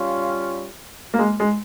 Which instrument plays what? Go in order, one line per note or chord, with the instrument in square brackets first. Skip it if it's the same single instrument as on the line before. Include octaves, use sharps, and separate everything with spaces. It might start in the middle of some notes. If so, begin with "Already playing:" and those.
Already playing: [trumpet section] G3 C#4 F4
[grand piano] A#3
G#3
G#3